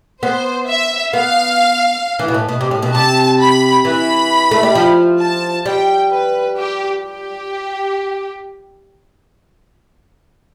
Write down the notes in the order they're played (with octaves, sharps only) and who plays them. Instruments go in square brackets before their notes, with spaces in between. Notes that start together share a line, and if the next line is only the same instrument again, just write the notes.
[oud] B3 [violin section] C5
[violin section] E5
[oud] B3 [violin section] F5
[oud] E3
B2
A2
B2
C3
A2
B2
[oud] C3 [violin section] A5
[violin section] B5
[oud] E3 [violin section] B5
[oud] A3
G3
F3
[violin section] A5
[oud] G3 [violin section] G5
[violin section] B4
G4
G4